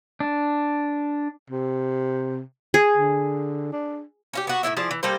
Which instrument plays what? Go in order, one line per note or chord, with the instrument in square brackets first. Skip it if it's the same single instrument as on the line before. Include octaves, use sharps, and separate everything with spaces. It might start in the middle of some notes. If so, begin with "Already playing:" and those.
[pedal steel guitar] D4
[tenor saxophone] C3
[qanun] G#4
[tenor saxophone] D3
D4
[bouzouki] C#4 F4 G4
B3 F#4
A2 C#3 E4 E5
F3 E4 G#4 D5
E3
G3 A#3 A4 C5